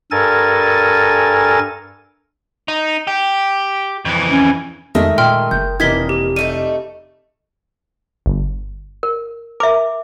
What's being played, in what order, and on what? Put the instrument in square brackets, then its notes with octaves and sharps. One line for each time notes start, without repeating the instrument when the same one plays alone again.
[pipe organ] G2 A4 A#4 G#5 A6
[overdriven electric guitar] D#4
G4
F2 E3
[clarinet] C#4
[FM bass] F2 [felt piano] D#3 G#3 A3 [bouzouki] A#4 D#5 E5
[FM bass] A#2 [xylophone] G5 C6 F6
[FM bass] F#1 [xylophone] G6
[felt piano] F1 E3 [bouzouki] A#3 D#5 [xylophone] G#6 B6 G7
[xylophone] G4
[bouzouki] G3 A3 D#4 [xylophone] D#7
[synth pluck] G1
[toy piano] A#4
[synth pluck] A#4 [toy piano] E5 D6